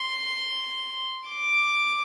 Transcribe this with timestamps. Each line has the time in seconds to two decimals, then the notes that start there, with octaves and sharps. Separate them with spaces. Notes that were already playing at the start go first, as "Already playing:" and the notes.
Already playing: C6
1.30 D6